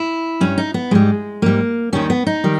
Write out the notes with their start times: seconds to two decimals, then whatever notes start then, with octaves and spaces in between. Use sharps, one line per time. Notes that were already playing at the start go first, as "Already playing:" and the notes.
Already playing: E4
0.41 G2 G3 C#4
0.58 D#4
0.74 B3
0.91 G#2 G3 G#3
1.42 G#2 G3 A#3
1.93 D#2 D#3 G3 C#4
2.10 B3
2.27 D#4
2.44 D#3 G3